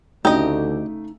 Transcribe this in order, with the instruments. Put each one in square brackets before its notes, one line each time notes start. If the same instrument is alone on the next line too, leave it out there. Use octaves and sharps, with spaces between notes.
[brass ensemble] D2 [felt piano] C#3 A3 E5 [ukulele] D#4 [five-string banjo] G4 D#5